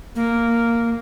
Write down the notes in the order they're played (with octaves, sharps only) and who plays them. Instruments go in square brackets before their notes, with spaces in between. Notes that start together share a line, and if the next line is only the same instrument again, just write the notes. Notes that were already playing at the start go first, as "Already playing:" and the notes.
[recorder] A#3